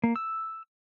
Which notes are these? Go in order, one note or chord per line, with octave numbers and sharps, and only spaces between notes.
A#3
E6